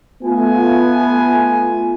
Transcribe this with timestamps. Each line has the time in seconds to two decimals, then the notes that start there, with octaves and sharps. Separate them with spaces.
0.24 A3 B3 F4 G#5